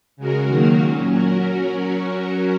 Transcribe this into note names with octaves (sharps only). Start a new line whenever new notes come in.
C#3 G#3 F#4 A#4
D#3 F#3 A#3 F#4 A#4
A#2 F#3 C#4
F#3 C#4 F#4 A#4